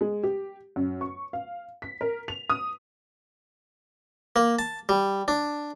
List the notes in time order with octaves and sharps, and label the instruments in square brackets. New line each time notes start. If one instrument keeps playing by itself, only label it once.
[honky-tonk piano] G#3
G4
F#2
C#6
F5
B6
A#4
F7
D#6
[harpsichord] A#3
A5
G3
D4